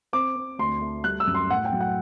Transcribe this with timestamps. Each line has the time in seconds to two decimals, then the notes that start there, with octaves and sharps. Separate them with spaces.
0.13 C4 D6
0.36 C4
0.59 D2 C6
0.81 A3
1.04 G3 F#6
1.20 E6
1.27 F#2
1.35 C6
1.50 A2 F#5
1.65 G5
1.72 F#3
1.81 F#5